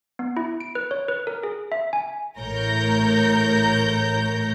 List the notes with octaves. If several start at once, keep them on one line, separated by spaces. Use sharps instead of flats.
B3
E4
D7
B4
C#5
B4
A#4
G#4
E5
G#5
A1 A2 A#4 C#5 G6 A#6